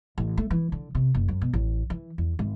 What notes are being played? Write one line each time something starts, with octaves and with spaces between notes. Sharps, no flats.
A1
A3
E3
D3
C3
F#1
F#2
B2
A1
E3
E2
G#1